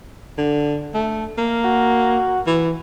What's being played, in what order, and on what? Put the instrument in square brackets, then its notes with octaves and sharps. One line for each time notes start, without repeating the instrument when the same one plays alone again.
[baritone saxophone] D3
A3
A#3
[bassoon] F#4
[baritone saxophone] E3